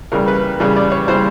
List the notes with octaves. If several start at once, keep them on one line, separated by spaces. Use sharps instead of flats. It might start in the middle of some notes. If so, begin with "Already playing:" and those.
C#3 E3 G3 A#4
B4
C#3 E3 G3
D5
C#5
C#3 E3 G3 C5